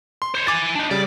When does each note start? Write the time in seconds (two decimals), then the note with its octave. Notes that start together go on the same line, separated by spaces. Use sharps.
0.22 C6
0.34 C5 C#5
0.47 E4 G#5 D6 A6
0.75 D4 D#4
0.91 C#3 G3 D5